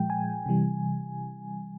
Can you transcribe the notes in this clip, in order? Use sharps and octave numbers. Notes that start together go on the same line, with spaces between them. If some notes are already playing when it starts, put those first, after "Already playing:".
Already playing: A#2 F3 G#3 G5
G#5
C3 E3 G3